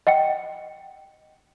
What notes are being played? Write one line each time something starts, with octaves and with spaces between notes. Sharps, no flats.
D#5 F#5 G5 C#7